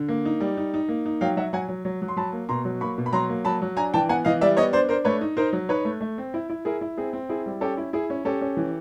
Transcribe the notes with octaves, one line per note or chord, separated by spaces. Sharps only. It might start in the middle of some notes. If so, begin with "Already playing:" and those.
Already playing: D3
A#3
D#4
G3
D#4
D#4
A#3
D#4
F#3 F5 G5
F#3 E5 F#5
F#3 F#5 G#5
F#3
F#3
F#3
C6
F#3 A5 B5
A#3
B2 A#5 C6
F#3
A#3 B5 C#6
B2
B5
F#3 A#5 C6
A#3
F#3 A5 B5
F#3
D4 G#5 A#5
E3 G5 A5
B3 F#5 G#5
E3 D#5 F5
G3 D5 E5
B3 C#5 D#5
D4 C5 D5
D4 A#4 C5
A3 B4 C#5
D#4
D#4 A#4 C5
F#3
D#4 B4 C#5
A3
A3
C4
E4
E4
E4 G#4 A#4
E4
C4 G#4
C4
E4 G#4
G3
C#4 G4 A4
E4
E4 G#4
C#4
C#4 G4 A4
C#4
E3